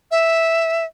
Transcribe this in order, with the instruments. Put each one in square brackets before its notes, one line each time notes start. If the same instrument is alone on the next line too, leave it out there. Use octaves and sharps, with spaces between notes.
[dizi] E5